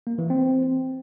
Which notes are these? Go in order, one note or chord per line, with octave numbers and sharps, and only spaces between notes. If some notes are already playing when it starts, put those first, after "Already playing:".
A#3
E3
C4